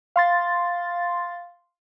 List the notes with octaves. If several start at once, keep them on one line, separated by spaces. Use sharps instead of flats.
F5 C6 A6